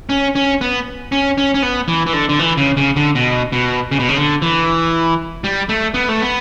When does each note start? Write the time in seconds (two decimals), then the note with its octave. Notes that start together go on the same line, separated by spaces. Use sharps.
0.09 C#4
0.35 C#4
0.61 B3
1.12 C#4
1.38 C#4
1.54 C#4
1.62 B3
1.88 E3
2.06 E3
2.13 D3
2.29 D3
2.39 E3
2.57 C#3
2.77 C#3
2.96 D3
3.15 B2
3.52 B2
3.92 C#3
3.99 B2
4.09 C#3
4.17 D3
4.42 E3
5.44 G3
5.69 A3
5.94 B3
6.09 A3
6.22 B3